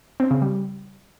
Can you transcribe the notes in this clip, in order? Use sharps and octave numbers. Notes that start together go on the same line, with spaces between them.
C4
C#3
G3